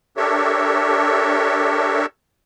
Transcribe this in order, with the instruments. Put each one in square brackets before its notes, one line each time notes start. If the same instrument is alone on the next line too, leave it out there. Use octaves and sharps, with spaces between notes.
[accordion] D4 G4 A4 A#4 C#5 E5